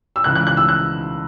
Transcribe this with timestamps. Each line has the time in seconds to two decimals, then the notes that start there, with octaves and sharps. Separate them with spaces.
0.16 E6
0.24 C#2 C#3 E3 F#6
0.35 F#6
0.47 F#6
0.57 E6
0.69 F#6